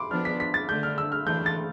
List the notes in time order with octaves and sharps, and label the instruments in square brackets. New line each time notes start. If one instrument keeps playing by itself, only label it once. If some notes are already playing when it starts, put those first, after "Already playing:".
Already playing: [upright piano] B5 C6 D6
[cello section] F3 B3 D4 [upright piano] F6
[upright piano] B6
B6
A6
[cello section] D3 A3 D4 [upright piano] G6
[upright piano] F6
E6
F6
[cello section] E3 A3 D4 [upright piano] G6
[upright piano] A6